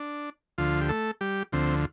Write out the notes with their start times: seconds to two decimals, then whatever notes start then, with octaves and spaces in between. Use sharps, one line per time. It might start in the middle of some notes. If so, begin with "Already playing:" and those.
Already playing: D4
0.58 D2 D3 F3 F4
0.81 G4
0.89 A3 A4
1.21 G3 G4
1.52 D2 D3 F3 C4